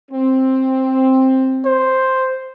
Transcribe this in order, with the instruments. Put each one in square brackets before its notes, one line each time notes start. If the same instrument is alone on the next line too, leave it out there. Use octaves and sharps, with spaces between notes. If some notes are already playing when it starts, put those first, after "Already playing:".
[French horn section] C4
[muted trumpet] C5